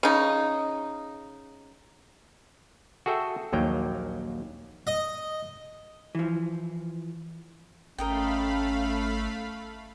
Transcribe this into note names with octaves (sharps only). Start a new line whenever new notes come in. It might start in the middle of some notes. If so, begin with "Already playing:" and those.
C#3 D#4
F#4 G#4 A4 E5 G5
A#1 D#2 F#3 A#3 G5
D#5
E3 F3
G#1 A3 C#4 A#4 D#5 F5 G5 B5